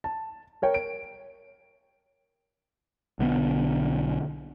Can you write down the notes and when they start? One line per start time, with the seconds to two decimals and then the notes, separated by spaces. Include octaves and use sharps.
0.04 A5
0.62 A#4 C#5 G5
0.74 D7
3.19 B1 D3 G3 B3